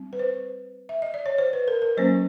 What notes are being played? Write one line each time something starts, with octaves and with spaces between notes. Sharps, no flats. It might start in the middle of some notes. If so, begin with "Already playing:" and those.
Already playing: G3 C4
B4
C5
E5
D#5
D5
C#5
C5
B4
A#4
A#4
F#3 A#3 C#4 C5